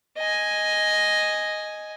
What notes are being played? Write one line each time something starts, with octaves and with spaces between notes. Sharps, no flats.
D#5 G#5